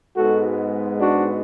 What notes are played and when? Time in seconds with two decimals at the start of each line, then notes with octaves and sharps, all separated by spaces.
0.17 G#2 G#3 B3 F#4 A4
1.01 D4 F#4